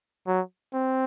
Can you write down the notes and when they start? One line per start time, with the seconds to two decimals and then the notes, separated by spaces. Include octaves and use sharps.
0.27 F#3
0.73 C4